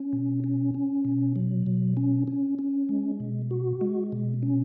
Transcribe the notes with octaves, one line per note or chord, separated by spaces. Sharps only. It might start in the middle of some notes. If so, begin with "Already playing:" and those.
Already playing: C#4
B2
C#4
C#4
B2
F#3
B2
C#4
C#4
C#4
G#3
B2
F#4
G#3
B2
C#4